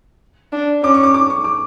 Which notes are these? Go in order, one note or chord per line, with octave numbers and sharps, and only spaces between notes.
D4
C#4 D6
C#6
D6
D6
C#6
D6